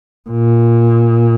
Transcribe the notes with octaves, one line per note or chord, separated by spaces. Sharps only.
A#2